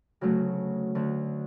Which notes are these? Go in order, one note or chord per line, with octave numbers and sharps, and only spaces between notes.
D2 C#3 F#3 A3 F#4
D2 D3 A3